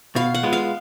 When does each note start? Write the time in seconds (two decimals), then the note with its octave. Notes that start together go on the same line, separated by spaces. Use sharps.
0.15 B2 F5
0.34 F#5
0.43 G#3 B3 F4
0.53 F5